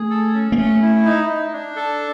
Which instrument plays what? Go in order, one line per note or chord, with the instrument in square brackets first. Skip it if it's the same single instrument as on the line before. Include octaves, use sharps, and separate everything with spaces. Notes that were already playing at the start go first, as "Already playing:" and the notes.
Already playing: [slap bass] A3 [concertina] G#4
[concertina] A4
C#4
[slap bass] A#3
[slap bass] A3 [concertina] C#4
[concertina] E4
D#4
D#4
D4
A4